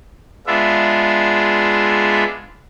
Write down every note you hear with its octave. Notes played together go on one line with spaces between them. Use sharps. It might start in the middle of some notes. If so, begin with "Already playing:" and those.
G#3 B3 D4 F4 E5